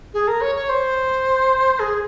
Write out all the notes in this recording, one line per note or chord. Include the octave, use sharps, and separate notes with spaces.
G#4
A#4
C#5
C#5
C5
G#4